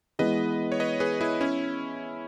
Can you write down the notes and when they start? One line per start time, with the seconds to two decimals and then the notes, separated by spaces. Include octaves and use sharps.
0.19 E3 G#3 B3 B4 D#5
0.72 C#5
0.80 B4 D#5
1.00 G#4 B4
1.21 E4 G#4
1.41 C#4 E4